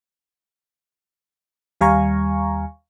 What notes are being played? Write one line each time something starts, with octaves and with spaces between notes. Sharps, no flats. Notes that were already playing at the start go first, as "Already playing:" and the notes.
D#2 G3 F5 G#5 A#5 C#6